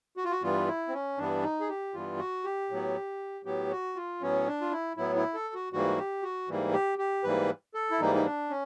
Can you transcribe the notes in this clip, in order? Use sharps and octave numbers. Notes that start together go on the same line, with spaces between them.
F#4
F4
F#4
G2 E3 G3 B3 F4
E4
C4
C#4
G2 E3 G3 B3 D4
D#4
G#4
G4
G2 E3 G3 B3 F4
F#4
G4
A2 F#3 B3
A2 F#3 B3 G4
F#4
F4
A2 F#3 B3 C#4
D4
F4
E4
A2 F#3 B3 E4
E4
A4
F#4
G#2 E3 G3 A#3 F#4
G4
F#4
G#2 E3 G3 A#3
G4
G4
G#2 E3 G3 A#3 B4
A4
E4
G#2 E3 G3 A#3 D#4
D#4
D4
C#4